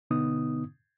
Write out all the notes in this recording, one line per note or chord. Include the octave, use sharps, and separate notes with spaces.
B2 D3 B3 D#4 D#6